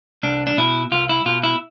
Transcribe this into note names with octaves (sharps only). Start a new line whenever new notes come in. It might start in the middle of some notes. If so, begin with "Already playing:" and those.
C2 D4
D4
B2 E4
C2 F4
E4
B2 F4
E4